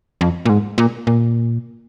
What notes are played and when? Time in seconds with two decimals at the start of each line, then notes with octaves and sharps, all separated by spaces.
0.21 F2
0.45 A#2
0.49 G#2
0.78 A#2
1.07 A#2